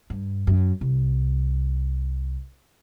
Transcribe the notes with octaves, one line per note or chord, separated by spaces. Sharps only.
G2
F#2
C2